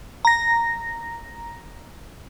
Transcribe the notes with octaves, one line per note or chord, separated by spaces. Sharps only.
A#5 A#6